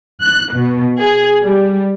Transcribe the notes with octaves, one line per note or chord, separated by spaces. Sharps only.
F#6
B2
G#4
G3